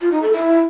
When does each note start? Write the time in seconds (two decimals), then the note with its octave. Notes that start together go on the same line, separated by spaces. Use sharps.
0.01 F4
0.12 D#4
0.22 A4
0.33 E4